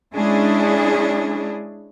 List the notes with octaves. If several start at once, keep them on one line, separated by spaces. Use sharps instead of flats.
G#3 C#4 D4 E4 G#4